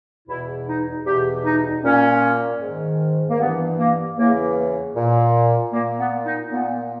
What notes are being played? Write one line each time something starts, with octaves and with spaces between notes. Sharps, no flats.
E2 B2 E4
D#4
E2 B2 G4
D#4
A#2 C#4
G#2 D#3
A#3
G2 E3 B3
A#3
E2 C#3 E3 A#3
A#2
A#2 A#3
B3
D#4
A#2 B3